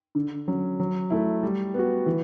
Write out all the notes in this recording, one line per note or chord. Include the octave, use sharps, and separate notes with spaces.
D3
F#3 C#4
F#3
A3 E4
G3
B3 F#4
E3